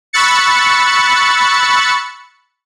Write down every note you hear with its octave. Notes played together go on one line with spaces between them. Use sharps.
B5 C#6 E6 F#6 A6 C#7